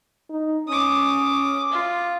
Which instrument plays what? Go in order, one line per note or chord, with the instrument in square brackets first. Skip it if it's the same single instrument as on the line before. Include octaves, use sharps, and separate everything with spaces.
[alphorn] D#4
[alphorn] C#4 [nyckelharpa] D6 D#6
[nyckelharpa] F4